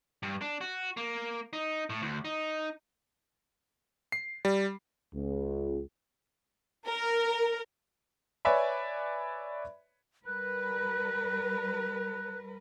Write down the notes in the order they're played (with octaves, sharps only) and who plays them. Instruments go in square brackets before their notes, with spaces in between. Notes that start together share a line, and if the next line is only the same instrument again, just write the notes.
[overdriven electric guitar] G2
D4
F#4
A#3
D#4
A2
D2
D#4
[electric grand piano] C7
G3
[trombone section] C#2
[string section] A#4
[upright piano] B4 C#5 D5 E5 G#5 B5
[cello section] G3 A#4 B4 [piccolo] F#6